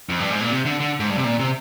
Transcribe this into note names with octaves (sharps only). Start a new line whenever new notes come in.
F2
G2
G#2
A#2
C3
D3
D3
G#2
G2
C3
A#2
C3